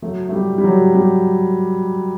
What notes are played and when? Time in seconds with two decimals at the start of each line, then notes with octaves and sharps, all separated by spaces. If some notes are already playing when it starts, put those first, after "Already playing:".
0.02 F#3 A3
0.29 A3
0.33 G3
0.58 G3
0.64 F#3
0.95 G3